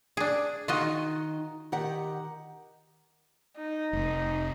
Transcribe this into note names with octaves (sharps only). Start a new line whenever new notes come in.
D4 G#4
D#3 D#4 F4 F#4 D#5
D#3 G4 F#5
D#4
F1